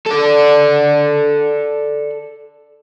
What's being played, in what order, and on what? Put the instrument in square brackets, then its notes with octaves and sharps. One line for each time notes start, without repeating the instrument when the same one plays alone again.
[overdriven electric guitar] A4 D5